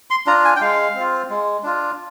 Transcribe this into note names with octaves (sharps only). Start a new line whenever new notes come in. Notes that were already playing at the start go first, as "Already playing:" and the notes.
C6
D4 F4 A#5
G#5
G5
G#3 F5
C4 F4
G#3
D4 F4